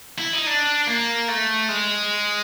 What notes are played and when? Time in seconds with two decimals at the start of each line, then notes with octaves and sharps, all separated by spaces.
0.18 E4
0.33 D#4
0.47 D4
0.87 A#3
1.28 A3
1.69 G#3